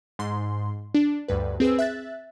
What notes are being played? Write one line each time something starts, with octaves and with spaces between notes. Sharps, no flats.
G#2 C6
D4
D2 G2 B4
C4 G#4 B4 E6
E5 F#6 A6